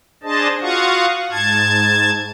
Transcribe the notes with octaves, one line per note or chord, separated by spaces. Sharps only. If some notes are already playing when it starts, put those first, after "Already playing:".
D4 G#4 C5 D#5 A5
F4 F#4 F5 F#5 C#6 D#6
G#2 A5 G#6